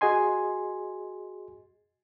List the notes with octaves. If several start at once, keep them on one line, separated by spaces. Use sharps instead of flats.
F#4 G#4 D#5 G#5 C6